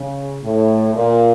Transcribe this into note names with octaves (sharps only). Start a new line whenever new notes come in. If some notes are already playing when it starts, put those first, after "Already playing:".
Already playing: C#3
A2
A#2